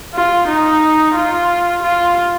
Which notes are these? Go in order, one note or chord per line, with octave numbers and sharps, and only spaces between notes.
F4
D#4
F4
F4